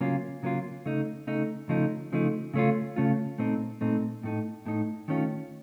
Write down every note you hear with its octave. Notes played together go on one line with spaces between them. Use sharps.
C#3 F#3 A#3 C#4 F4
C#3 F#3 A#3 C#4 F4
C#3 A3 D#4
C#3 A3 D#4
C#3 F3 A3 D#4
C#3 F3 A3 D#4
C#3 A3 C#4 F4
C#3 A3 C#4 F4
A#2 A3 C4 D#4
A#2 A3 C4 D#4
A2 A3 D#4
A2 A3 D#4
D#3 A3 C#4 F4